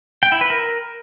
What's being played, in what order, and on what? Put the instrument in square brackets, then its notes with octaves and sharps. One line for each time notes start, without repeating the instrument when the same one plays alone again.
[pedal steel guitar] G5
E4
B4
A#4